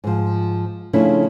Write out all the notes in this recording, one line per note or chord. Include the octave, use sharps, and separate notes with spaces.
G#2 F3
C#3 F3 A3 C#4 D4 E4